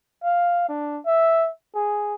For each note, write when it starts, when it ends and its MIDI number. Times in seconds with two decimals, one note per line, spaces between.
0.23 0.64 77
0.69 0.99 62
1.06 1.48 76
1.75 2.15 68